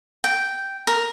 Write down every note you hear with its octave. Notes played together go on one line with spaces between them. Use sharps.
G5
A#4